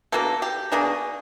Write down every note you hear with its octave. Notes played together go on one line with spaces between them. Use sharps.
B2 F#3 A#3 D4 A4
G4
B2 F#3 A#3 D4 G#4